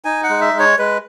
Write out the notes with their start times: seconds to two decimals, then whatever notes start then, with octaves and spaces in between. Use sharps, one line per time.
0.05 D#4 G#5
0.24 F#5
0.29 G#3
0.41 E5
0.53 G#3
0.59 C#5
0.79 G#3 B4